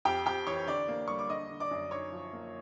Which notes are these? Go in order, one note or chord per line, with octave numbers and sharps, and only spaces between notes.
F2 G4 G5
F2 G4 G5
E3 C#5 C#6
D3 D5 D6
A#3
G3 C#6
D6
D3 D#5 D#6
D3
D5 D6
F#2
D#4 C#5 C#6
F3
A#3